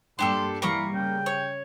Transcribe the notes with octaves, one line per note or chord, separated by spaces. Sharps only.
G2 G3 A#3 D4 G4 A4 C6
E3 G3 A#3 A#5 B5 C#6
C#3 G5
C#5